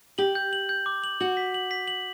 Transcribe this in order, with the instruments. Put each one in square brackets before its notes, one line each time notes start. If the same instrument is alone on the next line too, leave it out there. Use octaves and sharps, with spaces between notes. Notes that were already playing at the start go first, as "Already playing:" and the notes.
[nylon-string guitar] G4 [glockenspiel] F#7
[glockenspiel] G6
F#7
G6
D6
F#7
[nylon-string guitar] F#4 [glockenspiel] F#7
[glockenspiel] B6
F#7
B6
F#7